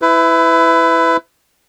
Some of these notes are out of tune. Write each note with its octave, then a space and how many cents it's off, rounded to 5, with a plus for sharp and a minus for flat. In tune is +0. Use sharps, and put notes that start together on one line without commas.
E4 +0 B4 +25